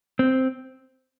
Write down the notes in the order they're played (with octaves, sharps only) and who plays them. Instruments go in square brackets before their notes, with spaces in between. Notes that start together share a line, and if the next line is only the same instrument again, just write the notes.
[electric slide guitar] C4